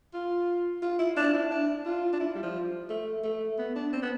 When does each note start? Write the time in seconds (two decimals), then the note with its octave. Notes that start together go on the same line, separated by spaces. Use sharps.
0.14 F4
0.82 F4
0.99 E4
1.17 D4
1.33 E4
1.51 D4
1.86 F4
2.13 D4
2.20 E4
2.35 G3
2.43 F3
2.90 A3
3.24 A3
3.59 B3
3.76 D4
3.93 C4
4.02 B3